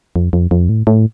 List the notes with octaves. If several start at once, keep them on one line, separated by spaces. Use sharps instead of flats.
F2
F2
F2
A2
A2